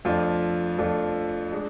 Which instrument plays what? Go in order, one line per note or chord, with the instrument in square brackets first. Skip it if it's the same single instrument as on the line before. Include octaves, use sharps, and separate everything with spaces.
[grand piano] F2 F3 A3 D4 F4
F2 F3 A3 D4 F4
G#3 D4